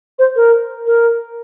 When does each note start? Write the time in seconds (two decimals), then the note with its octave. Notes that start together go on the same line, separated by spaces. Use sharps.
0.19 C5
0.36 A#4
0.86 A#4